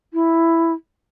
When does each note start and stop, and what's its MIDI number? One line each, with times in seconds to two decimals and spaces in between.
0.14 0.73 64